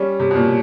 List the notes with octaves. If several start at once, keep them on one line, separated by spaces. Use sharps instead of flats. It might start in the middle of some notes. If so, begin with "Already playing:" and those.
Already playing: G3 C#4
C3
B2
A#2